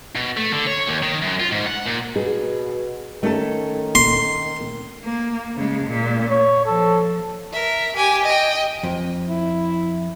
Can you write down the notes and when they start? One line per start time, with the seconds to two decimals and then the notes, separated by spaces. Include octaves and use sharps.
0.16 B2
0.37 A3
0.53 D3
0.67 C#5
0.87 D#2
1.03 D#3
1.22 F#2
1.40 F4
1.52 G#2
1.67 F#5
1.86 A#2
2.16 B2 G#4
3.23 D#3 A3 C#4 A4
3.95 C6
5.04 A#3
5.56 C#3 G#3
5.86 A#2
6.30 C#5
6.66 F3 A4
7.53 A#4 E5
7.96 G4 G#5
8.25 D#5 G5
8.83 F2
9.29 E4